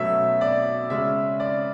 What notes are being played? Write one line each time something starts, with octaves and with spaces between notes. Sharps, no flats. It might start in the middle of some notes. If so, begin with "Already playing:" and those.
Already playing: B2 F#3 A3 C#4 E5
D5
C#3 G#3 C#4 E5
D5